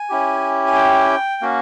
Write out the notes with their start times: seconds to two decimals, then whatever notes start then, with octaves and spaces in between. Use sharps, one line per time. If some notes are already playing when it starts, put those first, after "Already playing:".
Already playing: G#5
0.09 C#4 E4 G4
0.67 G#5
0.75 G5
1.42 A#3 C#4 F#4